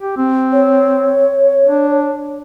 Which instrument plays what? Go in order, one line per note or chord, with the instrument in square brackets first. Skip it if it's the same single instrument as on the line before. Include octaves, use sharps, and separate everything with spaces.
[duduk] G4
C4
[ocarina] C#5
[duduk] D4